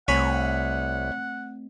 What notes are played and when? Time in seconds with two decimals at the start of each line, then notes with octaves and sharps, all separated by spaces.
0.08 C2 A3 C4 C#5 F#5 G#5 B5